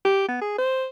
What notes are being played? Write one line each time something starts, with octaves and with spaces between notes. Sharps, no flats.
G4
B3
G#4
C5